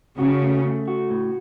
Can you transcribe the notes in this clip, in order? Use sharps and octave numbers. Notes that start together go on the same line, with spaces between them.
C#3 F#4
A3
A3
F#4
A2